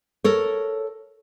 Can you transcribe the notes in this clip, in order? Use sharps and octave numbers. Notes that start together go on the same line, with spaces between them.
A4 A#4 C#5